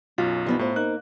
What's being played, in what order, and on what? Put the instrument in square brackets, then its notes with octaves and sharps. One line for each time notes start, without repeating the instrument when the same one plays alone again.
[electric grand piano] B1 F#2 [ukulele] F4
[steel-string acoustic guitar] F3 B3 D#4 [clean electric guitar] G3
[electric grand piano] A2 [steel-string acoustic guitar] C5 A#5
[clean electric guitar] A#3 D#4 [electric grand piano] F#6